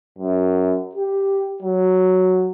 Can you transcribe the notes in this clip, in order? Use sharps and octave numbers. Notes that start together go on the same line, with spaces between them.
F#2
G4
F#3